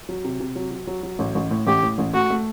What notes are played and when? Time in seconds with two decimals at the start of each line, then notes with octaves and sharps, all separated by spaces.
0.09 F#3
0.25 C3
0.40 C3
0.56 F#3
0.71 F#3
0.87 F#3
1.03 F#3
1.19 A1
1.35 A1
1.51 A2
1.67 A1 G4
1.83 A2
1.98 A1
2.13 A3 F#4
2.30 A3